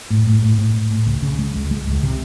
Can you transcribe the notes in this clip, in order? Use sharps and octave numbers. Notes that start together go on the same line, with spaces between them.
A2
A2
A2
A2
A2
A2
C#2
C#3
G#3
C#2
G#3
C#2
C3